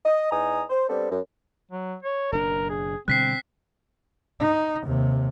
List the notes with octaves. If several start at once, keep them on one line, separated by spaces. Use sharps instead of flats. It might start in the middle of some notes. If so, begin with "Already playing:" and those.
D#5
E2 D#4 G#5 A#5 D#6
C5
G3 B3 C4 D4 A4
F#2
F#3
C#5
F#1 B2 D4 A#4
G#4
B2 D3 G3 C4 F#6 B6 C7
D#4
D#2 C3